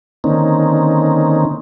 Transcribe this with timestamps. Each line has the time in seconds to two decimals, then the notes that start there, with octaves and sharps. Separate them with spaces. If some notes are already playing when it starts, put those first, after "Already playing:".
0.24 D3 D#3 A#3 C4 C#4 D#4